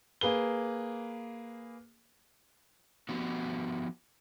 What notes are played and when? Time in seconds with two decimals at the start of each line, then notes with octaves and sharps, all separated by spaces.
0.21 A#3 G#4 B4 G7
3.09 F3 B3 F#4 G4